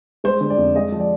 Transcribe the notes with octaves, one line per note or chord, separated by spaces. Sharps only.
G#3 C5
D3
D5
F2
G#3 D#5
F3
D5